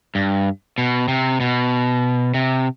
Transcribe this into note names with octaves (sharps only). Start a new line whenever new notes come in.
G2
B2
C3
B2
C3